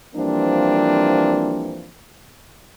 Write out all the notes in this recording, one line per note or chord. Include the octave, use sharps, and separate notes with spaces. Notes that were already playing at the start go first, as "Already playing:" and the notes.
E3 F3 G3 A#3 C4 D4